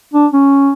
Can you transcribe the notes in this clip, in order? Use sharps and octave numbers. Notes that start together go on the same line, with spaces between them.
D4
C#4